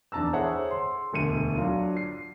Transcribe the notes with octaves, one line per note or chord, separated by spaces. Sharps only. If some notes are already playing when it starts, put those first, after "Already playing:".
E2 D4 A5 A#5 E6
G#4 A4 C5 C#5 E5 F#5
C6
E1 D2 C#7 D#7
F#3 D4 F4
C7